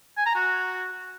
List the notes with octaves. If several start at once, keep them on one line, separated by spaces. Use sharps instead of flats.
G#5
A#5
F#4